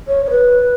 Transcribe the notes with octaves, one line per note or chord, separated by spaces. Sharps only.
C#5
C#5
B4